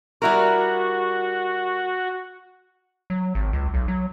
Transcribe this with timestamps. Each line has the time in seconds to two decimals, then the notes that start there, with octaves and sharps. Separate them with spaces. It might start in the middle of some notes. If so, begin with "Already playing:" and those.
0.22 G3 E4 F#4 A#4
3.10 F#3
3.35 G#1
3.53 C#2
3.74 B1
3.88 F#3